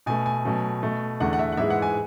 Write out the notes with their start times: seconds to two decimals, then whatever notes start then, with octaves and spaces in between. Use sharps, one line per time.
0.06 B2 A3 G#5
0.26 G#5
0.45 B2 F#3 A3
0.83 B2 A3
1.20 E2 D3 A3 F#5
1.33 F#5
1.39 E5
1.52 F#5
1.57 G#2 E3 G#3 E5
1.70 F#5
1.82 G#5